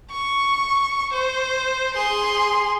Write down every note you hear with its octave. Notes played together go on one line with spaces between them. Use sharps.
C#6
C5
G#4 C6